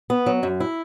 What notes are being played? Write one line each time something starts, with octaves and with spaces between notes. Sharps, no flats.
B3
F#3
F#2
E4